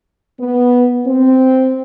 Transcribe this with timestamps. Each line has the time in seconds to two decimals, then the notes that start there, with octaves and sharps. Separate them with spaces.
0.39 B3
1.06 C4